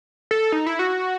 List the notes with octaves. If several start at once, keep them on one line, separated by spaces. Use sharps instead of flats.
A4
D#4
E4
F#4